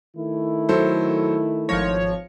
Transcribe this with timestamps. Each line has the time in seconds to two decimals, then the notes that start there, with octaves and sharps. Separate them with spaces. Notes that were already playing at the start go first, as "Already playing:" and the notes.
0.17 D#3 A3 E4
0.69 F#3 A4 C5
1.69 G#1 F3 C#5 F6 A#6